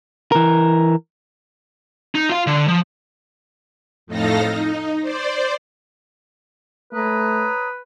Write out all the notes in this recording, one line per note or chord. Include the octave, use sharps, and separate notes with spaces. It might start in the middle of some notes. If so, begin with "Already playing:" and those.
E3 A#4
D#4
F4 F5
D3
F3
F2 A2 D#4 A4 F5 A#6
D#4
C5 D5
A3 B4 C#5 A#5 D#6